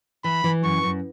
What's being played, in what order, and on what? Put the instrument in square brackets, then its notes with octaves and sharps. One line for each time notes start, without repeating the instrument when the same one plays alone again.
[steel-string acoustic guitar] E3 [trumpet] B5
[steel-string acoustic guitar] E3
[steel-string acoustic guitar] F#2 [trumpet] C#6
[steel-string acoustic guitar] F#2